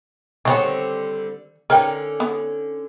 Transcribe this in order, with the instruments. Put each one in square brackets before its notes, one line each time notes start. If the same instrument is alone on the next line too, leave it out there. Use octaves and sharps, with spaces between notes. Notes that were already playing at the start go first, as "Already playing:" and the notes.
[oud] D3 G3 C4 [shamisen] D#3 B3 C#5
[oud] D3 C#4 D#4 [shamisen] A#4 B4 G5
[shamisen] B3